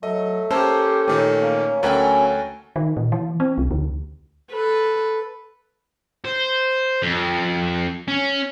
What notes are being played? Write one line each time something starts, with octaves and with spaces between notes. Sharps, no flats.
F#3 A3 D#5
A#3 C#4 G4 A4 C5
A#2 D#3 A3 C#4
A#3
D2 F#3 A3 C#4 A#4 B4 G5 G#5
D#3
A#2
E3
C4
C2
D2
A4 B4
C5
F2
C#4